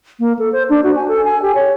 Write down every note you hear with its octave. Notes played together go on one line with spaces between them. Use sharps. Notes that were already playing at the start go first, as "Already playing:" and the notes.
A#3
A4
C5
D4
F#4
G#5
A4
G#5
G4
C#5